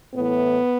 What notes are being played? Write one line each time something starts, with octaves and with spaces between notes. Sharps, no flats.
A2 E3 B3